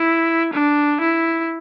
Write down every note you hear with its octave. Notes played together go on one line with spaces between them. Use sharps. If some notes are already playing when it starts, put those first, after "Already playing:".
Already playing: E4
D4
E4